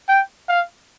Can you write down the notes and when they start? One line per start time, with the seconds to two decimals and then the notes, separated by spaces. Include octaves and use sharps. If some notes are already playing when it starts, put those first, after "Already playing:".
0.09 G5
0.48 F5